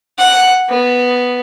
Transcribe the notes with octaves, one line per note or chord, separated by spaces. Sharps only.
F#5
B3